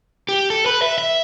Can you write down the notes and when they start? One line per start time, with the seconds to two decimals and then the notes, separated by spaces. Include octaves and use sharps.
0.29 G4
0.50 A4
0.66 B4
0.82 E5
0.98 E5